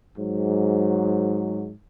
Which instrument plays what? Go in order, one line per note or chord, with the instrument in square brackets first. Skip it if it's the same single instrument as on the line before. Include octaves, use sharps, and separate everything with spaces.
[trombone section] G#2 F#3